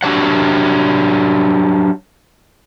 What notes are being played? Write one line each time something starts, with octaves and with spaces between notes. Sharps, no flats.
F#3 D4 G4 C#5 F#5